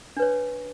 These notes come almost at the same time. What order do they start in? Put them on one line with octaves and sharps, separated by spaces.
D4 B4 C#5